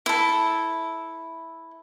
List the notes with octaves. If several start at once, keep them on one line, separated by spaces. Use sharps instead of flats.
E4 A4